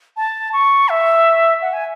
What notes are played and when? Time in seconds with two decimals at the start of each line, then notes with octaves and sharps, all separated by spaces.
0.17 A5
0.53 C#6
0.89 E5
1.62 F#5
1.73 G#5